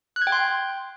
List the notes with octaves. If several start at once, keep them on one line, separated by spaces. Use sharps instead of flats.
F#6
G#6
G5
C6